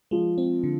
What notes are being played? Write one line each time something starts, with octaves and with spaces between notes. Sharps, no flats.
F3 G#3
C4
D3